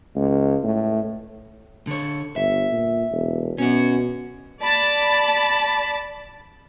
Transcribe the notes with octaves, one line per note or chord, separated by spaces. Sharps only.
C#2
A2
D3 C#5
G1 E5
A#2
E1
B2 C#4 F#4
D5 A5 B5